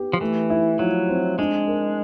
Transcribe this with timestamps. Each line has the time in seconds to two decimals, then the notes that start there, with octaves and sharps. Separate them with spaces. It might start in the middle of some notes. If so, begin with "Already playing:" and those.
Already playing: B3 G4
0.13 F3
0.21 E3 A3
0.50 E4
0.79 F3 F#3
1.09 C4
1.39 G#3 D4
1.68 A#4